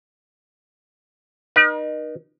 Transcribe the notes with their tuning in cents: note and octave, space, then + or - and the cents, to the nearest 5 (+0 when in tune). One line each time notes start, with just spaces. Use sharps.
D#4 -25 A#4 +45